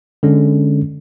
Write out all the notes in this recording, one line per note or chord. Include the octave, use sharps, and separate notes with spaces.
D3 G#3 C#4